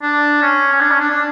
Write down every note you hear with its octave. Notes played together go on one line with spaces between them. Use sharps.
D4
C#4
C#4
D4
C#4
D4
D4